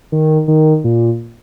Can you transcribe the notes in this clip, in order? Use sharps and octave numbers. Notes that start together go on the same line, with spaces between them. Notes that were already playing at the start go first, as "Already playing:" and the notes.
D#3
D#3
A#2